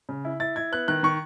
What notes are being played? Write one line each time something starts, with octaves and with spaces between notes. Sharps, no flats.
C#3
E4
E4 A6
E4 G#6
B3 F#6
D#3 F#6
D#3 C#6